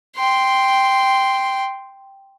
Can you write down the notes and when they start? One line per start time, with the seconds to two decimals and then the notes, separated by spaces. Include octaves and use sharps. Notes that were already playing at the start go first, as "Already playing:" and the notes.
0.17 G5 C6